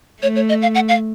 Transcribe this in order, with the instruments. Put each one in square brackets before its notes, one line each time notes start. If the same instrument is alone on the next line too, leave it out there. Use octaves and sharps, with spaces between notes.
[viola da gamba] A3 [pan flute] C#5
[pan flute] C#5
D#5
F5
F#5
F5